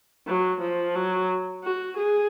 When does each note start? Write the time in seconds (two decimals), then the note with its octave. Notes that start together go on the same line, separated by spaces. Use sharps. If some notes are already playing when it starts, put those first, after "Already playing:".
0.27 F#3
0.61 F3
0.95 F#3
1.63 F#4
1.97 G#4